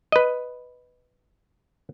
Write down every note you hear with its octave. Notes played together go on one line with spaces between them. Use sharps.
B4 D#5